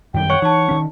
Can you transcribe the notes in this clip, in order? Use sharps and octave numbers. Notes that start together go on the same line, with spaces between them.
F#2 D#3 G3 G5
C#5 F#5 C#6
E3 D#4 A5 C#6
D#3 C#4